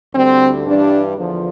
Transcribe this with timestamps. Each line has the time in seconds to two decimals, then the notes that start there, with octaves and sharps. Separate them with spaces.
0.14 D2 D3 G3 C4
0.66 G2 E3 G3 D4
1.17 E2 D3 F3